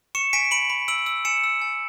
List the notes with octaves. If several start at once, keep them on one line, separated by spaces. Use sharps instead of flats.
C#6 C#7 E7
G#5 B6 D7
B5 D7 F#7
B5
E6 D7 F#7
E6
G#5 C#7 E7
E6
G#5